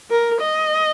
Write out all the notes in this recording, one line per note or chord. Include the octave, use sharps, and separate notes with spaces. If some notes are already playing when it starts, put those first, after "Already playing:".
A#4
D#5